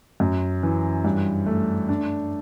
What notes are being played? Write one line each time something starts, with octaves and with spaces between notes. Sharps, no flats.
F#2
E3
G2
A3
D4